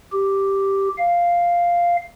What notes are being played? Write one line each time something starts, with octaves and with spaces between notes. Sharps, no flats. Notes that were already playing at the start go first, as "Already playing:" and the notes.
G4
F5